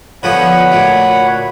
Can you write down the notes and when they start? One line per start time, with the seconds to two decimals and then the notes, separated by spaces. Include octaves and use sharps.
0.23 D3 F3 B3 C#5 F#5 B5
0.71 D2 A#2